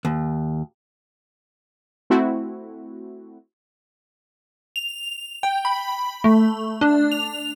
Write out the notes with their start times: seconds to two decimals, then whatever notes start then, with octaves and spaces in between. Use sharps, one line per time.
0.05 D#2
2.10 A3 C4 E4 F#4
4.76 F7
5.43 G5
5.65 B5
6.24 A3
6.81 D4
7.12 F7